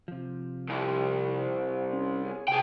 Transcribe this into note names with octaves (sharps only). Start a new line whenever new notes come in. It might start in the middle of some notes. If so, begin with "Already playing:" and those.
C3 F3
C2
C#4
G#4 C#5 G#5
C3 G#4 G5